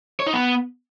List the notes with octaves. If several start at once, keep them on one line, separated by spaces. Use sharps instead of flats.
C#5
D#4
B3